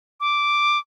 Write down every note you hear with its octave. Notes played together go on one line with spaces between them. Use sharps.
D6